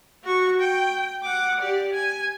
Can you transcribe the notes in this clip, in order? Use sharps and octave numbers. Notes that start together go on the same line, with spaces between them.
F#4 C#6
G5
F#5 D6
G4 D5
G#5